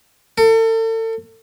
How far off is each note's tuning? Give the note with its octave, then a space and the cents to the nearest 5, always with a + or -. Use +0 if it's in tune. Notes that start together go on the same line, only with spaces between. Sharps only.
A4 +35